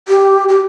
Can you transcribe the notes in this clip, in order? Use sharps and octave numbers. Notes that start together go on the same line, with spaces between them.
G4
G4